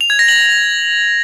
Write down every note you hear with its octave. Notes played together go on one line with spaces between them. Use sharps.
F7
G#6
A#6
F#7